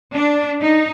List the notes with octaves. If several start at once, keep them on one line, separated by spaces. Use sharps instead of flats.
D4
D#4